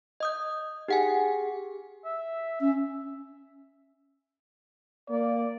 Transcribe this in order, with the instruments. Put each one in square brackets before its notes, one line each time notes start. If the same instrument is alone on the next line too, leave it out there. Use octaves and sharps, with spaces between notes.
[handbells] D#5 D#6 G6
[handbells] D#4 F#5 G#5 [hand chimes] G4 G#4
[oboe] E5
[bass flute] C#4 [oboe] E5
[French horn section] A#3 [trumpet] D5